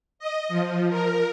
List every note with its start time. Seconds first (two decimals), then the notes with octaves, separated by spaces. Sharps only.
0.19 D#5
0.49 F3
0.90 A#4